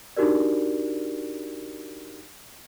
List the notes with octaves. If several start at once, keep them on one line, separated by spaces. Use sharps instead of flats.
D4 D#4 F#4 G4 A#4 D5